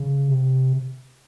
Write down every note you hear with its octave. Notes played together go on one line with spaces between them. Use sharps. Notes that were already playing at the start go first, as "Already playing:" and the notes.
Already playing: C#3
C3